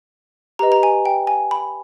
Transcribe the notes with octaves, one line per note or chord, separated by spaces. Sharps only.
G4 B4 D#5 A#5
A#5
G#5
G5
G#5
B5